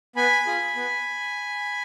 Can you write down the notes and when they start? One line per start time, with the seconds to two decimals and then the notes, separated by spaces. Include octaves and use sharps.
0.16 B3 G#5 B5
0.46 F4 G#4
0.76 B3